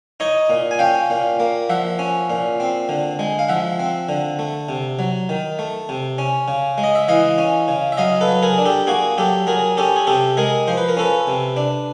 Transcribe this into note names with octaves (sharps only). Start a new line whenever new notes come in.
D#4 C#5 D#5
A#2
G#5
C#4 F5 G5
A#2
A#3
F3 E5 F#5
C#4
A#2
C4
D3
G#3
F5
F3 E5 F#5
C4
D3
A3
C3
F#3
D#3
A3
C3
C#4
C#3
G#3
D#5
E5
E3 D#5 F5
C#4
C#3
E5
F#3 D#5 F5
A4 B4
F#3
G#4 A#4
D4
G4 A4
A#3 F#4 G#4
F#3 G4 A4
F#3 G#4 A#4
C#4 G4 A4
G#4
C3 G4 A4
G#3 G#4 A#4
F3 C5
B4
A#4
C#4 A4 B4
C3
D4